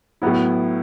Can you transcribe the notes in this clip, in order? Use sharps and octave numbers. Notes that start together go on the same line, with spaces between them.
A2 F#3 B3 E4